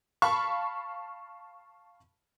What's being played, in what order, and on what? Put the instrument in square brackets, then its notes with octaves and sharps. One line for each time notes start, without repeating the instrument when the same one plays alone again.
[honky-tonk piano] F5 A5 B5 C#6